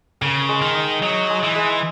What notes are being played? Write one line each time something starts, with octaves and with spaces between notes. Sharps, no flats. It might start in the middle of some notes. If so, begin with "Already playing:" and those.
C#3 A#4
G#3
D#3
D#4
F#3 D#4
G#3
E3
G#3